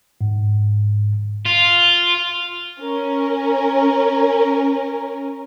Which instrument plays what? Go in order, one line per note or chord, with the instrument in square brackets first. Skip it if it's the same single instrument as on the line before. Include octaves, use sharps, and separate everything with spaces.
[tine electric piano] G#2
[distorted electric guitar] F4
[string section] C#4 A#4